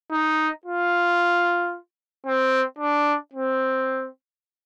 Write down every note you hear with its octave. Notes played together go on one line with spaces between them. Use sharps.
D#4
F4
C4
D4
C4